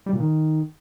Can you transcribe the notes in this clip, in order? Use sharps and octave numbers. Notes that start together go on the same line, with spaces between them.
G3
A#2
D#3